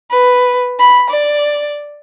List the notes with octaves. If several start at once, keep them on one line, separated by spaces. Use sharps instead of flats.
B4
B5
D5